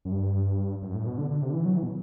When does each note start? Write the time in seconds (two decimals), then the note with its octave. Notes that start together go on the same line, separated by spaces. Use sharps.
0.05 F#2
0.11 G2
0.82 F#2
0.95 A2
1.06 B2
1.18 D3
1.30 D3
1.42 C3
1.50 D3
1.53 E3
1.65 F#3
1.77 E3
1.83 B2